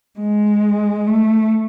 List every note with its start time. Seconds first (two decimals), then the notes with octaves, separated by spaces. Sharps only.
0.20 G#3
1.07 A3